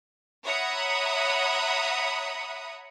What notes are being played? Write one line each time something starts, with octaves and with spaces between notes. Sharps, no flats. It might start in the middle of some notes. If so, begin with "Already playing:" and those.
C#5 E5 F#5 A#5 B5 D#6